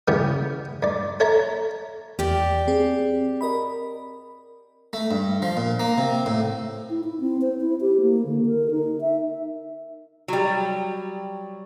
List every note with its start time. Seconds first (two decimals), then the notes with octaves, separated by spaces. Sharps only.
0.08 C#3 E3 G3 B3 G4 G#4
0.83 G2 D5
1.20 A4 C#5 E5 A5 A#5
2.19 E2 G4 D5
2.68 C4 G#4
3.41 A#4 D#5 B5
4.93 A3
5.11 G2
5.42 F3
5.57 A#2
5.79 A#3
5.98 C3
6.26 A2
6.90 E4
7.04 E4
7.20 C4
7.41 C5
7.61 E4
7.81 G4
8.01 A#3
8.25 D3
8.46 A#4
8.71 D#4
9.01 E5
10.28 F#3 G3